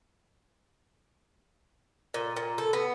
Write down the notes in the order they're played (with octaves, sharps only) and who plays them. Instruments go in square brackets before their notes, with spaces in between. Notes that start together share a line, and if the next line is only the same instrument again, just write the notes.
[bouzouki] A#2
A#2
A4
B3